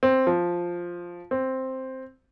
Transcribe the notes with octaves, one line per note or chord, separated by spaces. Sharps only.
C4
F3
C4